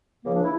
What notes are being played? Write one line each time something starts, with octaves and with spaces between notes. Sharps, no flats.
C#2 C#3 F3 A#3
D4
E4